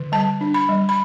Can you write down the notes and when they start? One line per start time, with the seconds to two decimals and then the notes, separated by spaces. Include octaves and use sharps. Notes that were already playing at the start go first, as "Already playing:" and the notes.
Already playing: D3
0.12 G3 A5
0.41 D4
0.54 B5
0.69 G3
0.89 B5